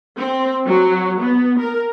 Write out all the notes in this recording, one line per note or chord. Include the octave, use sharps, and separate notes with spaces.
C4
F#3
B3
A#4